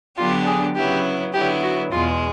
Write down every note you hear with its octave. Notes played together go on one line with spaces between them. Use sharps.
D3 F#3 B3 D4 F4 G4
G#4
C#3 F#3 B3 E4 G4
D3 F#3 B3 E4 G4
F#4
E2 B2 G#3 F4